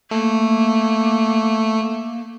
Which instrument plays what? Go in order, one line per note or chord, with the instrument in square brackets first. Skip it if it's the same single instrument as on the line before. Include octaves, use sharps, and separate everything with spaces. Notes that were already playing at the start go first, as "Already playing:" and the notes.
[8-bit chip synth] A3 [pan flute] A#3